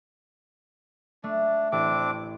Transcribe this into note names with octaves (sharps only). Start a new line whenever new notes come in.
A3 D4
A1 C4 D4 D6